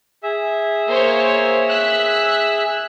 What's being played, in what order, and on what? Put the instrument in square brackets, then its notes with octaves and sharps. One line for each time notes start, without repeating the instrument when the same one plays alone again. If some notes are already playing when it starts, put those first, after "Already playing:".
[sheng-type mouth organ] G#4 E5
[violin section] A#3 C5 C#5
E6 F#6 B6